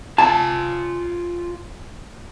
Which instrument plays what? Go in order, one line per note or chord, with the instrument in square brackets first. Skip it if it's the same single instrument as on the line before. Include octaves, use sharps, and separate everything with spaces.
[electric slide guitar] F4 G#5 [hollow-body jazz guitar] A5